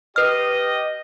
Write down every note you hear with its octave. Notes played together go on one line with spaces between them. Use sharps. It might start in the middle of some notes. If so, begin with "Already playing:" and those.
G4 B4 D#5 F6